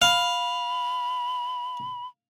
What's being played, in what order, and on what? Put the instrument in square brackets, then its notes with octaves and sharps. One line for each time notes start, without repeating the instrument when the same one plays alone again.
[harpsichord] F5 [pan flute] B5